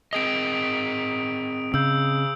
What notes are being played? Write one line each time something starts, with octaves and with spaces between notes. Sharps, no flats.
C4 G#4 D#5 D#6 D7
C#3 E6 G6